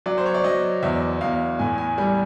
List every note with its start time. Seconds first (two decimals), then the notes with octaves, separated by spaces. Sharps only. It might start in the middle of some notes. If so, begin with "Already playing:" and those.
0.06 F#3 D5
0.18 C5
0.26 C#5
0.34 D5
0.44 F#3 D#5
0.83 E2 E5
1.21 E2 F5
1.59 A2 G#5
1.78 G#5
1.98 G3 G#5